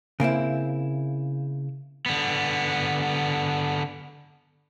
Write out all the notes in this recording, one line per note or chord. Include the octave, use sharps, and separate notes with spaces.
C#3 A#3 C4 E4
D3 B3